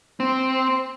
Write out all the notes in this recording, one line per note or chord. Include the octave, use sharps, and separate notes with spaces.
C4